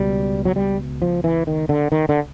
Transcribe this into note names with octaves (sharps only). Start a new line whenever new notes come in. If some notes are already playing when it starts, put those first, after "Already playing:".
Already playing: C#2 B2 G3
F#3
G3
F3
E3
D#3
D3
D#3
D3